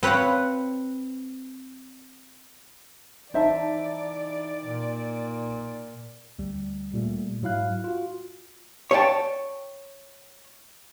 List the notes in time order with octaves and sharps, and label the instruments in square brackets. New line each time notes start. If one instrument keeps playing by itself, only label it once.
[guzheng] C4 B4 C#5 F5 F#5
[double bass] E3 [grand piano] D#4 [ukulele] C5 E5 A5 [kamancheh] D5
[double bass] A#2
[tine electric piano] D2 G3
A#2 G3 A3
G#2 F#3 E4 F5 F#6
F4 F#4
[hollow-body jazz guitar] C#5 E5 F#5 G5 A5